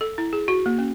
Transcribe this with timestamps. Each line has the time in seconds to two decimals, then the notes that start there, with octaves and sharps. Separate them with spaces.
0.01 A4
0.18 E4
0.33 G#4
0.48 F#4
0.66 A#3
0.79 C#4